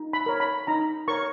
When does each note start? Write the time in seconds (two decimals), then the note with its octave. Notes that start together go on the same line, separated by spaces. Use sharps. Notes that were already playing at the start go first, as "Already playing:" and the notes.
Already playing: D#4
0.13 B5
0.26 A#4 C#5
0.40 B5
0.67 D#4 A#5
1.08 A#4 C#5 C#6